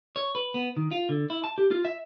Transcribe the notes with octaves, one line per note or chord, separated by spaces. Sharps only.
C#5
B4
B3
D#3
F4
D3
E4
A5
G4
F4
E5